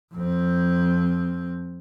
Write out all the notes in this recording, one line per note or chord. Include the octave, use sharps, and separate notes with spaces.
F2 C4